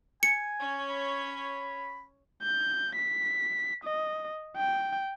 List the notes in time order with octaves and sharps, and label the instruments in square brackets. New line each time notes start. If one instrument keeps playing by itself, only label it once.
[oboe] G#5 [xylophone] C#7
[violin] C#4 C#5
[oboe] B5
[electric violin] G6
B6
D#5
G5